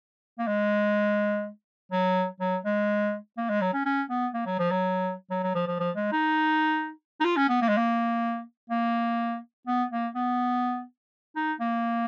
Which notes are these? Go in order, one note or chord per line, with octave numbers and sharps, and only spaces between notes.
A#3
G#3
F#3
F#3
G#3
A#3
G#3
F#3
C#4
C#4
B3
A#3
F#3
F3
F#3
F#3
F#3
F3
F3
F3
G#3
D#4
D#4
F4
C#4
B3
A#3
G#3
A#3
A#3
B3
A#3
B3
D#4
A#3